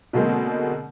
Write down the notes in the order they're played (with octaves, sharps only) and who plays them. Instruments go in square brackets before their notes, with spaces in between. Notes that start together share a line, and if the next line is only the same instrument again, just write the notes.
[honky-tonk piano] B2 D3 F#3 G#3 A#3 C4